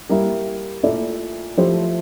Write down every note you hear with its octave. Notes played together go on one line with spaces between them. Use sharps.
G3 A#3 E4
A#2 A3 E4 A4 D5
F3 A3 E4 G4 C5